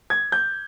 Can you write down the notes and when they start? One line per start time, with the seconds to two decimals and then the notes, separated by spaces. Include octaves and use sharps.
0.10 G#6
0.32 G6